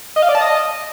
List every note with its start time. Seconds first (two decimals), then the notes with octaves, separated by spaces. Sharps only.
0.16 D#5
0.22 F5
0.29 D5
0.35 A5
0.41 D#5